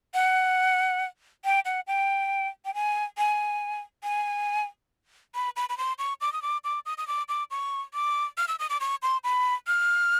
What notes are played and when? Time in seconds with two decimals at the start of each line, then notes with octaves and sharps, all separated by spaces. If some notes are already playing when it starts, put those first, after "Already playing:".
0.14 F#5
1.45 G5
1.65 F#5
1.87 G5
2.65 G5
2.74 G#5
3.18 G#5
4.03 G#5
5.35 B5
5.56 B5
5.69 B5
5.78 C6
5.98 C#6
6.21 D6
6.33 D#6
6.42 D6
6.64 D6
6.86 D#6
6.98 D#6
7.07 D6
7.28 D6
7.51 C#6
7.94 D6
8.37 F6
8.48 E6
8.59 D#6
8.70 D6
8.80 C#6
9.02 C6
9.24 B5
9.67 F6